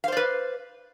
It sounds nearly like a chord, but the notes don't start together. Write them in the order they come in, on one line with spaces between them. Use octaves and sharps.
F5 C5 D5 B4